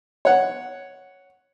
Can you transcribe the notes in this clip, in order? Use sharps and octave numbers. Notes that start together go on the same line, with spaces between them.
C#5 F#5